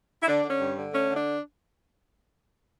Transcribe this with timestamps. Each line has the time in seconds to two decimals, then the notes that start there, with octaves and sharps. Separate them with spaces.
0.22 E4
0.28 D3 D4
0.44 D3
0.49 C#4
0.60 G2
0.77 D3
0.93 A3 C#4
1.09 D3
1.15 D4